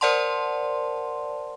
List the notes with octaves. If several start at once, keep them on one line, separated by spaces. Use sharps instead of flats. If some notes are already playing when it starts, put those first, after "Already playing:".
A#4 C5 D5 F#5 A5 C6